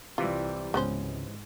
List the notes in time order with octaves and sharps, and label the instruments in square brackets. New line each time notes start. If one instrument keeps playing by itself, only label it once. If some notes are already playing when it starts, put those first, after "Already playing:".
[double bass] C2 G3 [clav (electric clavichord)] C3 E3 [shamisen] F4
[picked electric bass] C#2 [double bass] G#2 [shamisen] B3 C#4 C5